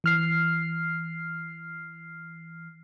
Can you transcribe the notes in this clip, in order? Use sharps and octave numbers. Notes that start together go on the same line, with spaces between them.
E3 F6 C7